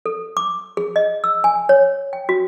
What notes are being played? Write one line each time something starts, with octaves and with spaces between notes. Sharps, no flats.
A4
D6
G#4
D#5
E6
G#5
C#5
G5
F#4